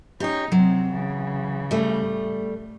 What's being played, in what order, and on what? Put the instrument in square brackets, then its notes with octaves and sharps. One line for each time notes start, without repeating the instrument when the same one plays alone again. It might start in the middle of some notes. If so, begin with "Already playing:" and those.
[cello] C#4 D#4 [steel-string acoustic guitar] G4 C#5
[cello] C3 C4 [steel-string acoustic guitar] F#3
[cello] C#3 E3
[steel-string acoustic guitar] G3 A3
[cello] A2